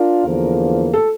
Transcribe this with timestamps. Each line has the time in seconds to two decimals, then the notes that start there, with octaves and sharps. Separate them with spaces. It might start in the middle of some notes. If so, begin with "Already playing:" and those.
Already playing: D4 F4 A#4
0.25 E2 D3 F3 A#3
0.94 A4